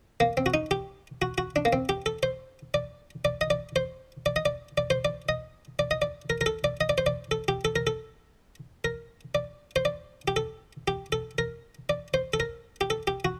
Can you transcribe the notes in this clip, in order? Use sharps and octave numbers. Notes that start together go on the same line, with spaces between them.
A#3
C4
F#4
D#4
G4
F#4
F#4
D4
A#3
C4
G4
A4
C5
D5
D5
D#5
D5
C5
D5
D#5
D5
D5
C5
D5
D#5
D5
D#5
D5
A#4
A#4
A4
D5
D#5
D5
C5
D5
A4
G4
A4
A#4
A4
A#4
D5
C5
D5
G4
A4
G4
A4
A#4
D5
C5
A4
A#4
G4
A4
G4
F#4